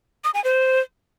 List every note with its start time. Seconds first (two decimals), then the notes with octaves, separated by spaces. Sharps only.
0.24 D#6
0.34 G#5
0.44 C5